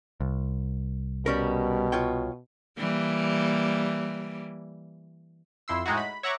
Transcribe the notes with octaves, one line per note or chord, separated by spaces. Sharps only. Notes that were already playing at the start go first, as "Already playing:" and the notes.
C2
B2 G3 C#4 A#4
F4 C#5 G5
E3 G3 A#3
F2 E4 C6 E6
A2 G#3 D#4 E4 F#4
B5
C#5 E5 F#5 A#5 C#6 D6